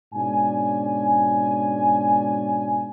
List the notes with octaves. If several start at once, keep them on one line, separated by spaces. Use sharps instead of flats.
G#2 B2 C#4 D4 G#5